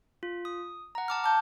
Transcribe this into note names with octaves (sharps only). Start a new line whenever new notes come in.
F4
D#6
F#5 A#5
A5 D6 F6
A5 D6 G6